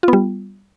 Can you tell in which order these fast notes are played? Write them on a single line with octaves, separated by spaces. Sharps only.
F4 B3 G3